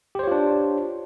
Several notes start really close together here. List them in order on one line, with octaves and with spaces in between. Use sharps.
G4 C5 C#5 F4 D4